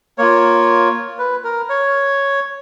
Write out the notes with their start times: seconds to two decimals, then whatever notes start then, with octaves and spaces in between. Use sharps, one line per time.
0.18 A#3 F4 C#5
1.19 B4
1.44 A#4
1.69 C#5